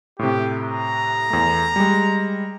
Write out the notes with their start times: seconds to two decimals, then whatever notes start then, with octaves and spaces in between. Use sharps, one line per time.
0.19 A2 C3 G4
0.59 A#5
1.30 E2 A3
1.76 G3 G#3